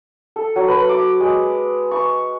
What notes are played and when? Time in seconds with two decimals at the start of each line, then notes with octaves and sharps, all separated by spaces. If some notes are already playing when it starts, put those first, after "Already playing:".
0.36 A4
0.56 F#3
0.68 B4
0.89 D6
1.21 G#3
1.91 C#6